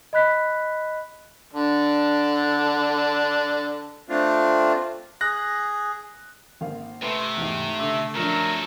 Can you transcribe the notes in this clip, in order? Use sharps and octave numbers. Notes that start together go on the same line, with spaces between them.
D#5 B5 F#6 B6
D3 D4
A3 C4 D4 F4
G#4 F#6 A#6
G#1 A#3 F5
C3 A3 B4 C6
E2 G#2
D3 E5 D6
F3 F#3 D4 A4 A#4